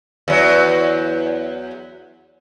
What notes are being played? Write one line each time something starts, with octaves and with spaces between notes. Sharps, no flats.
E2 F#3